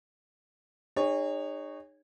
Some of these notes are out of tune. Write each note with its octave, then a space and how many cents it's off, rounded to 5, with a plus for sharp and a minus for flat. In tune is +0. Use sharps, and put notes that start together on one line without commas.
D#4 -35 G#4 -35 C#5 +0